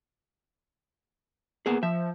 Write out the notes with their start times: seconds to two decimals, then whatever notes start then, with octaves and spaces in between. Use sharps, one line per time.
1.66 A#3 B3 G#4
1.83 F3 E5